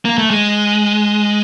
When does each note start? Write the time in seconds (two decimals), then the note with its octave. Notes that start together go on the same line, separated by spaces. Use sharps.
0.05 A#3
0.18 A3
0.30 G#3